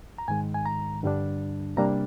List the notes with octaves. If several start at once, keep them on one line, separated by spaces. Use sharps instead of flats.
A#5
G#2 D#3 G#3 G#5
G#5
A#5
G2 D3 G3 D4
C3 G3 A#3 D4 A#5